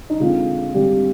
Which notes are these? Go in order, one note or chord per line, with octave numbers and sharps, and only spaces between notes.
D#4
D3 G#3 C4 F4
D3 G3 G#3 C4 G4